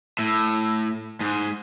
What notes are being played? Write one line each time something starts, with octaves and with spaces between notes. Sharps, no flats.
A2
G#2